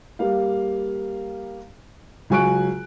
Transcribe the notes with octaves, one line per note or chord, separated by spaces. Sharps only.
G3 A#3 F5
C#2 F#3 G#5 C#6 F#6 D7